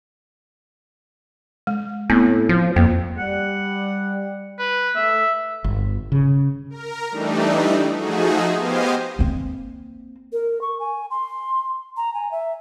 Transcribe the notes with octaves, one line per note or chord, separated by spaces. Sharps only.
G#3
A2 B3 C4
F3
F2 A#3
G3 F#5
B4
A3 E5
G1
C#3
A#4
E3 G3 A3 D4 D#4
F3 A3 D#4 F#4 G#4
B3 G4 C5 D#5 F5 G#5
A#3 C4
A#4
C#6
G#5
C6
A#5
G#5
E5